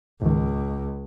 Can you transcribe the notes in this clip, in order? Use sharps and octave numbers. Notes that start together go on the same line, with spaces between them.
C#2 G#2 D#3